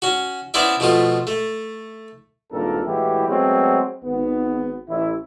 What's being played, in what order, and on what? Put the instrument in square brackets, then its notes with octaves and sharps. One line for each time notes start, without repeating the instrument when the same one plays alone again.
[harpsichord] C#4 F#4
B3 C#4 E4 C5 D5 E5
B2 F3 A3 F4
A3
[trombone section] G#1 G2 A#2 A4 A#4
A2 E3 G#3 E4 F#4 G4
F#3 G#3 A3 B3 C4
G#1 B3
A1 E4